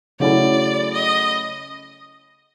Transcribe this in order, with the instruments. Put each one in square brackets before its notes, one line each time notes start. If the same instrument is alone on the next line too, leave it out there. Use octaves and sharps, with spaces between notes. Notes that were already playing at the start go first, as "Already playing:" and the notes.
[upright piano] C#3 F#3 A3 C#4 E4 [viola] D5
[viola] D#5